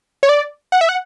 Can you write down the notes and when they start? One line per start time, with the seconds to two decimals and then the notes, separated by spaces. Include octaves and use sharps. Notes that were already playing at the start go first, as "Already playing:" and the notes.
0.23 C#5
0.29 D5
0.72 F#5
0.81 E5
0.89 F#5